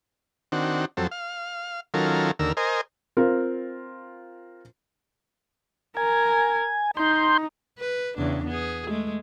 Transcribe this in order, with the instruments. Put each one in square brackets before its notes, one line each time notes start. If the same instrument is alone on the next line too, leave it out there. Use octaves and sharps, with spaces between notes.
[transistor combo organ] D#3 C4 D4 F#4
F2 F#3 C4 A4
F5
D#3 F#3 C#4 F4 A4 A#4
D#2 D3 A#4 E6
A#4 C5 D#5 G#5
[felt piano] C4 F4 A#4
[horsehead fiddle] A#4 [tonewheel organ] G#5
[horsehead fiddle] D#4 [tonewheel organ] C6 G6
[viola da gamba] B4
E2 C#3 D4
B3 G#4
G#3 A3